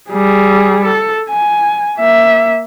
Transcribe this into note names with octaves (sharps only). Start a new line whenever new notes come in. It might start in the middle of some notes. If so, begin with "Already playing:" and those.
G3 G#4
A4
G#5
A#3 E5